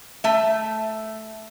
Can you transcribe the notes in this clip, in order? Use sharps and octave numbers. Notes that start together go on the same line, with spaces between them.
A3 E5